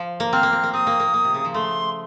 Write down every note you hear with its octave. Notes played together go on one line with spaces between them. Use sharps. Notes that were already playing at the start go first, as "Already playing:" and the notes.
Already playing: F3
A#3
C4 F6
A#3
C4
A#3
C4 D#6
A#3
A#3
A#3
C3
C#3
F3
A3 C6